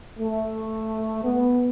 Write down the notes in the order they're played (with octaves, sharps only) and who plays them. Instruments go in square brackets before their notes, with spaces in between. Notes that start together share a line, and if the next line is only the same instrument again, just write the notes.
[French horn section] A3
B3